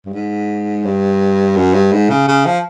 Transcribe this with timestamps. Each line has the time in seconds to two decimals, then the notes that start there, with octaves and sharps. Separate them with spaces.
0.06 G2
0.13 G#2
0.85 G2
1.56 F#2
1.74 G2
1.92 G#2
2.10 C#3
2.28 C#3
2.45 F3